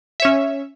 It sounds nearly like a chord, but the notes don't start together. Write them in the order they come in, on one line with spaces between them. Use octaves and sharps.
E5 C#5 C#4